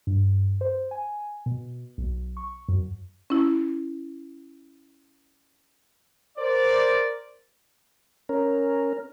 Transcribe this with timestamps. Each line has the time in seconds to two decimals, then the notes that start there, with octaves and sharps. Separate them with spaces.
0.07 G2
0.61 C5
0.91 G#5
1.46 B2
1.98 B1
2.37 C#6
2.69 F#2
3.30 C#4 E4
6.38 A#4 C5 D5
8.29 C#4 A#4